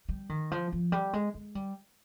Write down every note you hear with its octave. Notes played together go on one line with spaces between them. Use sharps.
G3
D#3
F3
F3
G3
G#3
G#3
G3